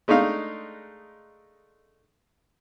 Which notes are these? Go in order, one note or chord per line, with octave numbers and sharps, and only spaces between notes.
G#3 A3 D4 D#4 F5